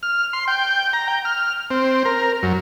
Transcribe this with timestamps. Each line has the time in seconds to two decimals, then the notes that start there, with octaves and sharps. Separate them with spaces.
0.03 F6
0.33 C6
0.48 G5
0.93 A#5
1.08 G5
1.25 F6
1.71 C4
2.05 A#4
2.43 F#2